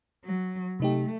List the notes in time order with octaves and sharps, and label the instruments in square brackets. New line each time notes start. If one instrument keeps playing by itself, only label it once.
[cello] F#3
[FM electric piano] C3 D#4 G4 [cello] A3